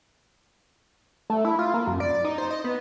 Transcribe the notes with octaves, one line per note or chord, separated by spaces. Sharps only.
A3
E4
F4
A#3
F#2
D5
D#4
C5
D#5
B3